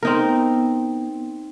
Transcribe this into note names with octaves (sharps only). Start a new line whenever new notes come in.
B3 C4 D#4 A#4